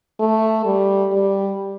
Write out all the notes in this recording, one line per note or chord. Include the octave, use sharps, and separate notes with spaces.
A3
G3
G3